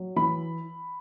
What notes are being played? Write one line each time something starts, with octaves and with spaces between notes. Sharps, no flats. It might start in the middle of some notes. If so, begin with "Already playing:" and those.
Already playing: F#3
E3 B5